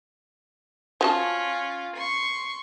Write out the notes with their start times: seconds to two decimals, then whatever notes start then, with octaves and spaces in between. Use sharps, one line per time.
1.01 F3 C#4 F4 F#4 A5
1.96 C6 C#6